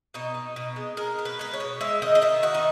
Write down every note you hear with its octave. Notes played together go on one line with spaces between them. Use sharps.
B2 D#4
B2
B2
G#3
G#3 A#4
B2
B4
G#3 B4
C#5
B2
G#3 E5
D#3 D#5
D#5
D#3 E5
D#3 F#4
D#4